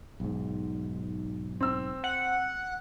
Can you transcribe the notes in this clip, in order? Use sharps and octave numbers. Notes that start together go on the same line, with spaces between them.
B1 G#2
C4 E6
F#5